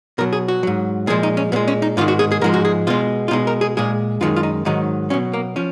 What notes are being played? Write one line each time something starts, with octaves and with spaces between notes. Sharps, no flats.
B2 F#3 A#4
G#4
F#4
G#2 F#3
A#2 F3 G#3 G#4
D#4
C#4
A#2 G#3 B3
C#4
D#4
G#2 D#3 G#3 F4
F#4
G#4
G#4
G#2 F3 G#3 A#4
F#4
G#4
B2 G#3 F4
F4
B2 G#3 D#4
A#4
G#4
A#2 G#3 G#4
F#2 D#3 G#3 F4
F4
D#4
G#2 D#3 F#3 D#4
B2 F#3 C#4
A#3
F3 C#4